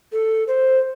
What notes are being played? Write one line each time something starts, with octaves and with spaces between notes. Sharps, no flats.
A4
C5